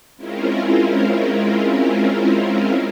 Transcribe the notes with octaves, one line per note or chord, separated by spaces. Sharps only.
G#3 C4 C#4 E4 F4 A#4